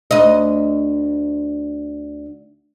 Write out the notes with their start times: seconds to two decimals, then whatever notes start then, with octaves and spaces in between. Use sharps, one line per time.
0.11 D2 D#5